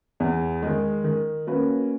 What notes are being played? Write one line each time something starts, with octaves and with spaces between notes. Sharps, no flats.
E2
D#3 G#3
D#3
A#3 C#4 F#4 B4